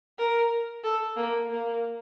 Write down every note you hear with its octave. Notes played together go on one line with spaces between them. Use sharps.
A#4
A4
A#3
A#3